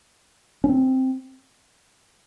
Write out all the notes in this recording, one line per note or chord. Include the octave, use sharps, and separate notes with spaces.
C#4
C4